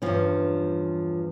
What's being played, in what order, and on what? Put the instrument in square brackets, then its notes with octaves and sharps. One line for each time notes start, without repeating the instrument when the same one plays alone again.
[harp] E2 G2 G3 [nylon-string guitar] F3 C#4